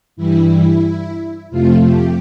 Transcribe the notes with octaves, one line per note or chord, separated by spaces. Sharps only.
G2 E3 G3 E4
F2 C3 F3 A3 F4
G4